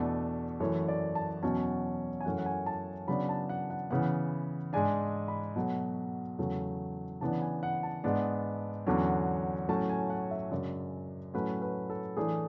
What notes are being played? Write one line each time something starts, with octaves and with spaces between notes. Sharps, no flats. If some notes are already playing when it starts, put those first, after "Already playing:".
Already playing: E2 B2 A3 D4 A4
F#2 E3 A3 C#5
D5
A5
E2 B2 F#3 C#4 A5
G#5
F#2 E3 A3 C#4 F#5
F#5
G#5
A5
C#3 F#3 B3 D4 B5
A5
F#5
F#5
C#3 E3 B3 F#5
G#2 G#3 D4 G#5
B5
B2 F#3 A3
E2 C#3 F#3 A3
C#3 E3 B3 D4 A5
G#5
F#5
A5
G#2 G#3 B3 D4
E2 D3 F#3 C#4
A2 F#3 A3 C#4 A5
G#5
F#5
E5
F#2 C#3 G#3 D4 D5
A2 F#3 A3 C#4 B4
B4
A4
A2 E3 A3 D4 G#4